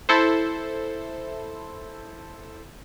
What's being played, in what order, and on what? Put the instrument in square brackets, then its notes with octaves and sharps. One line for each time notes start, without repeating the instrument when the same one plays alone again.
[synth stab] E4 A4 C5